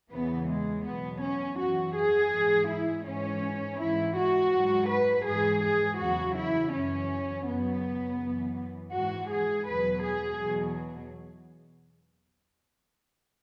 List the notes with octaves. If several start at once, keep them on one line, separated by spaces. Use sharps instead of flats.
E2 C#3 E3 B3
G#3
E2 B2 F#3 B3
C#4
F#2 E3 F#4
G#4
G#2 E3
E4
G#2 E3 C#4
G#2 E3 E4
F#4
G#2 F#3
B4
G#2 E3 G#4
G#4
E2 C#3 F#3 F#4
E4
F#2 E3 C#4
F#2 C#3 F#3 B3
F#2 E3
G#2 E3 F#4
G#4
E2 B2 F#3 B4
G#4
E2 B2 F#3